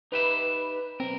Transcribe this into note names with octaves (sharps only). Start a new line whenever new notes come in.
D#4 G4 B4 E5
B1 C4 A#4